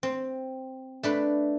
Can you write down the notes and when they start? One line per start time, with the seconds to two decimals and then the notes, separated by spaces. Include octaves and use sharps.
0.03 C4
1.03 A3 D4 B4